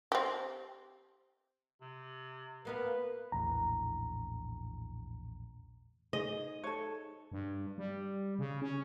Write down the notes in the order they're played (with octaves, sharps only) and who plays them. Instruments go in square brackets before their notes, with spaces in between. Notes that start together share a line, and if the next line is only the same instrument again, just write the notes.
[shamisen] C4 G4
[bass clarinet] C3
[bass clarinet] D2 [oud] A#3 B3 F5 [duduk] B4
[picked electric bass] A#1 E2 A2 [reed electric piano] A#5
[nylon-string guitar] D#4 G#4 C5 [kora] D#5
[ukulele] A4 C#5
[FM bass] G2
G3
C#3
C#4